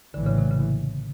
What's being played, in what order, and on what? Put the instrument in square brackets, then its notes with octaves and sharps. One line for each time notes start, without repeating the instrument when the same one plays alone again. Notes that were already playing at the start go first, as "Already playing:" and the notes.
[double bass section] A#1 A2 E3 [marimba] D3
[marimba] C#3
C3
C#3